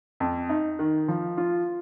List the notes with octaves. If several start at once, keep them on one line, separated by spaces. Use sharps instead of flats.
F2
D#4
D#3
F3
F4